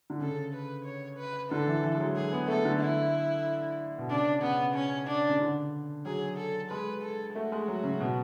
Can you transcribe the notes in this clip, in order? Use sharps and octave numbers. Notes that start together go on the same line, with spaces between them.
D3
C#3 A4
B4
C#5
B4
D3 A4
E3
E3
G#3
F#3
G#4
B3
A3 A4
D3
E4
B2
C#3 D4
C#3 B3
C#4
D4
C#3
D3
F#3 G#4
A4
G#3 B4
A4
A3 F#4
G#3
F#3
C#3
B2